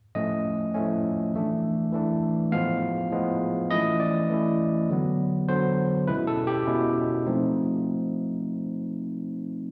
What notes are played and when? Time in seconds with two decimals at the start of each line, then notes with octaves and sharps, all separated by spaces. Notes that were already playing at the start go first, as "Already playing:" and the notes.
0.15 A2 F3 A3 C#4 D#5
0.74 A2 F3 A3 C#4
1.34 E3 A3 D4
1.93 E3 A3 D4
2.52 A2 F3 G#3 B3 F5
3.11 A2 F3 G#3 B3
3.71 E3 A3 C#4 E4 D#5
4.00 D5
4.30 E3 A3 C#4 E4
4.89 D3 F#3 B3
5.49 D3 F#3 B3 C5
6.07 B2 G#3 C#4 E4 B4
6.27 A4
6.47 G4
6.67 B2 G#3 C#4 E4
7.26 F3 A3 C4 D#4